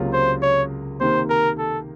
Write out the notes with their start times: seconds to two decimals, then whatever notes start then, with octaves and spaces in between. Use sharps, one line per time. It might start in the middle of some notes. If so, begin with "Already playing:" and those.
Already playing: C#2 C3 F#3 A#3 F4
0.13 C5
0.42 C#5
1.01 C3 D#3 A#3 C5
1.30 A#4
1.58 A4